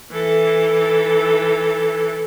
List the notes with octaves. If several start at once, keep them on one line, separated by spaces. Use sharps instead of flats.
E3 A4